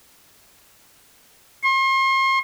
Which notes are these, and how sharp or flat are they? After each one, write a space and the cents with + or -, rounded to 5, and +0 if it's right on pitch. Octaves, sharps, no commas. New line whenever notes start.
C6 +40